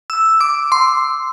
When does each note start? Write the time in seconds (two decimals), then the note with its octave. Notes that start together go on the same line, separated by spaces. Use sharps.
0.10 E6
0.41 D6
0.72 C6